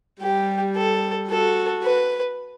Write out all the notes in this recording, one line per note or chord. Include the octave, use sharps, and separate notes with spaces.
G3 G4
A4
F#4 A4
B4